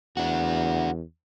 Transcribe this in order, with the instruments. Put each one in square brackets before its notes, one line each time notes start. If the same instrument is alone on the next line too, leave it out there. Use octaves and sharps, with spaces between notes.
[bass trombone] E2 [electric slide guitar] D4 F#4